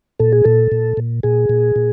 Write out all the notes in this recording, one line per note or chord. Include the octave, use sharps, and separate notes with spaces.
A#2 A4
G#4
A#2 A4
A#2
A#2
A#2 G#4
A#2
A#2